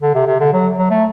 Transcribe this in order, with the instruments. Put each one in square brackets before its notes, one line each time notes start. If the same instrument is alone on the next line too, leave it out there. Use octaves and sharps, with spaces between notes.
[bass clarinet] D3
C3
C3
D3
F#3
F#3
A3